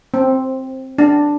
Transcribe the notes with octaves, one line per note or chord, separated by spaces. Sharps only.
C4
D4